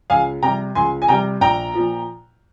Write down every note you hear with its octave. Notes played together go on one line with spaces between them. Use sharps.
C#2 F5 G#5
C3 G3 G5 A#5
C#2 G#5 C6
G#5
C3 G3 G5 A#5
A#1 G5 A#5
A#2 F3